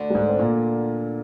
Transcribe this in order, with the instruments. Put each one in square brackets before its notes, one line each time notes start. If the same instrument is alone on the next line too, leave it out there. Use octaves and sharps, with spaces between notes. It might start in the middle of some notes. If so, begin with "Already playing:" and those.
Already playing: [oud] D2 D3
[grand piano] G3
G#2 G#3
C4
A#2 A#3